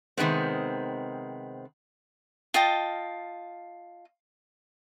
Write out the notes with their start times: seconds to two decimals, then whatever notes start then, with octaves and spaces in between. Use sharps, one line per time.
0.17 C3 D#3 G#3 B3 C4
2.54 F4 D#5 G5 A5